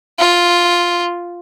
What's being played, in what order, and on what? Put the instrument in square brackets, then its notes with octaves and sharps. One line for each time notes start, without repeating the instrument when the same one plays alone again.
[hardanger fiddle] F4